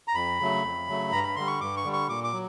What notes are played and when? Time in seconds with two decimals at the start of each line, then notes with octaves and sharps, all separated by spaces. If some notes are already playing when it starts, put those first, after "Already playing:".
0.08 A#5
0.15 F2 B5
0.40 C#3 F#3 A3
0.64 F2
0.88 C#3 F#3 A3
1.11 G2 A#5
1.23 B5
1.36 D3 G3 C6
1.47 C#6
1.61 G2 D6
1.77 C#6
1.84 D3 G3
1.93 C#6
2.08 A#2 D6
2.24 D6
2.33 F#3